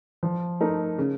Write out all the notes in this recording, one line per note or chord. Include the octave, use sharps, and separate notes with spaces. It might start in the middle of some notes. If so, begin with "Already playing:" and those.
F3
A3 D#4 A#4
C#3